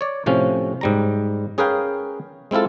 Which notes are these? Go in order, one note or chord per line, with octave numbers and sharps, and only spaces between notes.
C#5 D5
A2 C3 F3 C#4
G#2 G3 A#5
C#4 G#4 A#4 B4 F5 G5
G#3 C4 E4 F4 A4